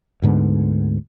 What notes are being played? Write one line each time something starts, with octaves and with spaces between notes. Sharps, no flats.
D2 G#2 D3 B3